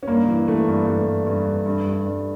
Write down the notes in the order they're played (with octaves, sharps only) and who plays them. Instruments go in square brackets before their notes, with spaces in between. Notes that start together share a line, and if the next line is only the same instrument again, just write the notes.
[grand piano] C#4
G2 A#3
E3
E3 A3
G2
G2 A3
G2
G2
G2
G2
G2
G2